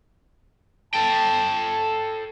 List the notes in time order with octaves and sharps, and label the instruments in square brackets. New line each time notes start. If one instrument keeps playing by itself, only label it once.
[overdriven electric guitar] A4 G5 [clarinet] A5